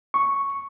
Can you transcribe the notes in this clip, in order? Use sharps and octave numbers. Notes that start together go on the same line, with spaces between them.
C#6